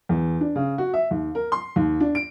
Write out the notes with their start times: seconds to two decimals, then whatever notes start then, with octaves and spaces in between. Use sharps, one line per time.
0.09 E2
0.41 D4
0.56 C#3
0.78 F#4
0.94 E5
1.11 D#2
1.35 A#4
1.52 C6
1.76 D#2
2.00 D4
2.15 D7